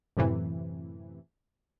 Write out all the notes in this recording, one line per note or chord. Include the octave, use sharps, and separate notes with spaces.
F#2 A2 C3 E3